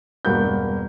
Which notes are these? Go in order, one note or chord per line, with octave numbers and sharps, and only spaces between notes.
E1 G2 A#3 F#4 B5 G6